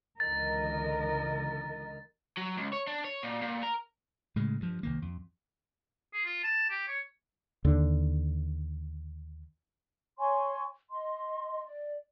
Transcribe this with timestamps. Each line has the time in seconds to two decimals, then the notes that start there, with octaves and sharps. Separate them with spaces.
0.20 C#2 D3 E3 A#4 D#5 A6
2.37 F#3
2.57 C#2
2.73 C#5
2.87 D4
3.04 C#5
3.23 A#2
3.42 A#2
3.63 A#4
4.36 A2 C#3 G#3
4.60 G2 F3
4.83 C2 D#3 A#3
5.02 F2
6.14 G#4
6.25 F4
6.44 A5
6.70 G4
6.88 C#5
7.64 D#2 D3
10.19 C#5 G#5 C6 C#6
10.89 D#5 C6
11.64 D5